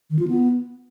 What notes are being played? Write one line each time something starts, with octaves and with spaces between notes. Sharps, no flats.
D#3
F4
B3